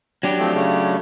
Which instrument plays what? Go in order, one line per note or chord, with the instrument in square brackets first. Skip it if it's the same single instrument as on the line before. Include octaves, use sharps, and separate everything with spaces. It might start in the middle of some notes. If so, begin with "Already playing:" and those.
[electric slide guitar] F#3 D4 G4
[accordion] F3 A3 C4
C#3 A3